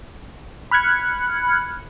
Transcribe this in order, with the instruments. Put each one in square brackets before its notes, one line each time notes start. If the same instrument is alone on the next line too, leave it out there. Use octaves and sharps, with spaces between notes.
[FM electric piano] B5 F6 F#6 G#6 C#7